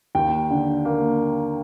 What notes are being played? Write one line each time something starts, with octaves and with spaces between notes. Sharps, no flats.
D#2 G5
D3
A#3